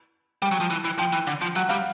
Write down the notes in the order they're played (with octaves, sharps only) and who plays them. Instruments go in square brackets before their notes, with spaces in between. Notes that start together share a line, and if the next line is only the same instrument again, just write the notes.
[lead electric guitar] G3 [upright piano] G5
[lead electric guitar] F#3
F3
E3
E3
[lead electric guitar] F3 [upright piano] G5
[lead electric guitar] E3
D3
F3
[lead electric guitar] F#3 [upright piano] F#5
[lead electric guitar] G3 [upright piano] F5